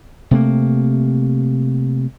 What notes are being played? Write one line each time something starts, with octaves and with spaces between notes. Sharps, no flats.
C3 A3 A#3